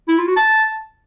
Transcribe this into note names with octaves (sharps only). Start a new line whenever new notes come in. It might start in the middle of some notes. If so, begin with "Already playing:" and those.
E4
F4
F#4
A5